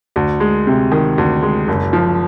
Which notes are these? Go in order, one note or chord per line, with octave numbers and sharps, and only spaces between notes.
D2
G#3
C3
D#3
D2
G#3
F#1
F3